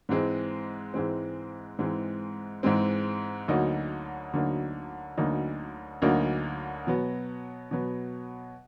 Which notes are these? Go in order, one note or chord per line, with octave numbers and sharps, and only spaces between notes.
G#2 E3 G#3 C4
G#2 E3 G#3 C4
G#2 E3 G#3 C4
G#2 E3 G#3 C4
D2 D3 F#3 A#3 D#4
D2 D3 F#3 A#3 D#4
D2 D3 F#3 A#3 D#4
D2 D3 F#3 A#3 D#4
B2 F#3 B3
B2 F#3 B3